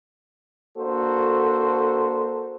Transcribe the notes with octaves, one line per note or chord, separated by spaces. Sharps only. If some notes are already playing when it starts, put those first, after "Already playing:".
A#3 D4 F#4 A4 C5